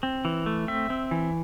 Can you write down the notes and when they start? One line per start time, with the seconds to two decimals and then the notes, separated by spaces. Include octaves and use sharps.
0.03 C4
0.25 E3
0.46 A3
0.68 C4 E5
0.90 C4
1.11 E3